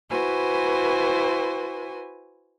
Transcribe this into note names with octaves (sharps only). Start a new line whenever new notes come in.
E4 F#4 B4 C5 G#5